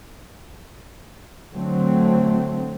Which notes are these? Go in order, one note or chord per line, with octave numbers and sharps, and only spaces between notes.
D3 F#3 A3 C4